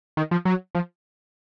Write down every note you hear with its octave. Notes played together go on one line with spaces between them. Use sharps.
D#3
F3
F#3
F3